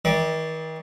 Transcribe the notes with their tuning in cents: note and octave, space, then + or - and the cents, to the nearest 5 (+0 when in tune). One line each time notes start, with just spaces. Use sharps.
D#3 +40 D5 +0